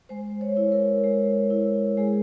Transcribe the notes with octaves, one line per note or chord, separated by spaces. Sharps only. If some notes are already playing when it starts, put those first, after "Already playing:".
G#3 C5
C#5
E4
A#4
G#3
E4
G#3 G#4